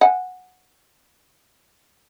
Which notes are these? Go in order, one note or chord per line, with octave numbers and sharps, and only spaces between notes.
F#5 G#5